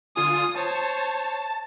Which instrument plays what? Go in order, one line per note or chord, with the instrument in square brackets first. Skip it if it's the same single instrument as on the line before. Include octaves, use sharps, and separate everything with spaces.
[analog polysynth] D3 F4 G#5 [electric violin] D#6
[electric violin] C5 C#5 [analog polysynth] A5